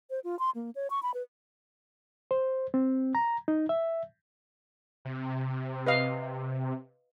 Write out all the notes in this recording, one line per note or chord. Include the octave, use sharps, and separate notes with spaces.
C5
F4
C6
A#3
C#5
C#6
B5
B4
C5
C4
A#5
D#4
E5
C3
B4 D#5 F5